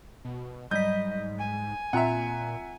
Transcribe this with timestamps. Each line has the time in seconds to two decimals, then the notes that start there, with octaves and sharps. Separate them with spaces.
0.25 B2
0.71 G#2 F#3 G3 D#5 G6 B6
1.40 G#5
1.93 A#2 C4 F4 E5 F#5 A#5